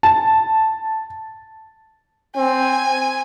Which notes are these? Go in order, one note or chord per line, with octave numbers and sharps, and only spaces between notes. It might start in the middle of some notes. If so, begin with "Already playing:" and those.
A5
C4 G#5